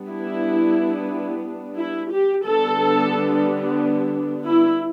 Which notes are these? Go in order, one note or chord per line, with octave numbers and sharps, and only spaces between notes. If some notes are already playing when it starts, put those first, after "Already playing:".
Already playing: G3 B3 D4
E4
E4
G4
D3 G3 B3 D4 A4
E4